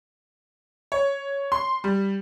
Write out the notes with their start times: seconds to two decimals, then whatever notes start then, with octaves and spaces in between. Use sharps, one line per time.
0.92 C#5
1.52 C6
1.84 G3